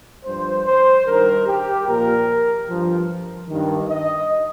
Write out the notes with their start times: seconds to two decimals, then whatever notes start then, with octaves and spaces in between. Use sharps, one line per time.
0.24 G2 F3 C5
0.65 C5
1.05 G2 D#3 A#4
1.46 G4
1.87 A#2 F3 A#4
2.67 G2 F3
3.48 G2 D#3
3.89 D#5